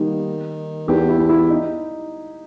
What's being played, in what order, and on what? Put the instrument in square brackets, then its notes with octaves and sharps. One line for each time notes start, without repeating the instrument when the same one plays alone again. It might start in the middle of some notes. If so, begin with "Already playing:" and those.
Already playing: [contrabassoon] D#3 [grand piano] G3 A#3 B3 G4
[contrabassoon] E2 [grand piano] G4
[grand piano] E4
[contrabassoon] E2
[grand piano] E4
D#4